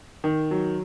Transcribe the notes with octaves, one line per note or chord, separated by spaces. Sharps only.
D#3
F#3